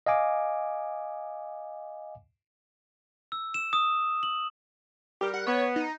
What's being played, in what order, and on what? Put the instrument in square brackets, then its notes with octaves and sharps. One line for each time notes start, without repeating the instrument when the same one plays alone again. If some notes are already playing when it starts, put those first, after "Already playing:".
[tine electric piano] D#5 F5 G#5 D6
[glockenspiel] E6
E7
D#6
F#7
[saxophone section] G3 A#4 [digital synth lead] G4
[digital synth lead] F#5
[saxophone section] B3 [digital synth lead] C#5
[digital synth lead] D#4